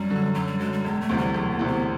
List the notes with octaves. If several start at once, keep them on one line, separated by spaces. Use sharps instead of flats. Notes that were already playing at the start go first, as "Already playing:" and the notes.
Already playing: F#2 G3
D3 F#3
F#2 F#3
G3
D3 F#3 G#3
G3
E1 G#3
A3
D2 C3 E3
G3
E1 F#3
A#3
D2 C3 E3
B3